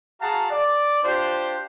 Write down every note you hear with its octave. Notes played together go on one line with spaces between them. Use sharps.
F#4 G#4 F5 F#5 A5 A#5
D5
D4 F4 G4 C5